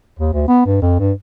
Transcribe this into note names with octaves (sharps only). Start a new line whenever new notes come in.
D#2
D2
B3
G2
F2
G2